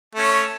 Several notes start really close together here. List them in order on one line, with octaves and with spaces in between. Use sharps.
A3 C#4 C#5